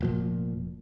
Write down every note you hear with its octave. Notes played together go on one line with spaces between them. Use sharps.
F1 A#2 F3